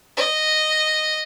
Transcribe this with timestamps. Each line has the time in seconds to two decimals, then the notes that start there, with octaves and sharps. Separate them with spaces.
0.17 D#5